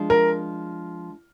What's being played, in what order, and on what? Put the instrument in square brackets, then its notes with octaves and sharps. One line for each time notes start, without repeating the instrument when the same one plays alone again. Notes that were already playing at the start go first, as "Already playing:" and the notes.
Already playing: [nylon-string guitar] F3 G#3 D4
[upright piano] A#4